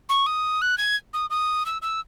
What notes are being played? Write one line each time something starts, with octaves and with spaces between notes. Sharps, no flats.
C#6
D#6
F#6
G#6
D#6
D#6
E6
E6